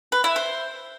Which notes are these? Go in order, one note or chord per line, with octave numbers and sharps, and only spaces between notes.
B4
E4
C5